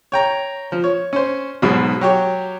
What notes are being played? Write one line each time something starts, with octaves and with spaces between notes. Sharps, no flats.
C#5 G5 A#5
F3
C#5
C#4 C5
B1 G#2 B2
F#3 G4 C#5